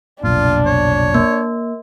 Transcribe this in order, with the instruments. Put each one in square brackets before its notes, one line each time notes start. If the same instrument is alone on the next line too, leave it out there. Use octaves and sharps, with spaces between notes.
[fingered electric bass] F1 B1 A#2 [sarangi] D4 [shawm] F4
[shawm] C#5
[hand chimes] A#3